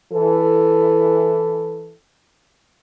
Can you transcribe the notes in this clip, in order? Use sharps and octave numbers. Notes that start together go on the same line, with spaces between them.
E3 A4